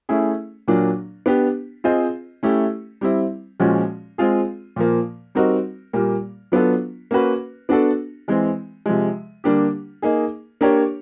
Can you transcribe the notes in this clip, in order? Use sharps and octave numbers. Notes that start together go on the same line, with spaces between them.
A3 C#4 E4 G#4
A#2 F#3 A#3 D4
B3 D4 G4
C4 F4 G#4 C5 D#5
A3 C#4 E4 G4
G3 C4 E4
A#2 F3 G#3 C#4 F#4
G#3 C4 F4 G#4
A#2 F3 A#3
G3 C4 D#4 F#4 A#4
A#2 G3 A#3
F#3 B3 D4 F4 A4
A#3 C#4 F#4 B4
B3 D4 F#4 A4
E3 G#3 C4
C3 F3 G#3
D3 G3 A#3 D4 G4
A#3 D#4 G#4
A#3 D4 G4 A#4 C#5